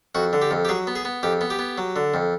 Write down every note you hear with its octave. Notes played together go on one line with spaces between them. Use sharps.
F2 F#4
D3
G4
F2
G4
F#3 G#4
B3
G#4
B3
F2 G4
B3
G4
B3
F#3
D3
F2